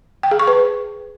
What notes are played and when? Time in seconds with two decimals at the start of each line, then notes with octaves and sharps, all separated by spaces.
0.23 G5
0.31 G#4
0.39 C#6
0.48 B4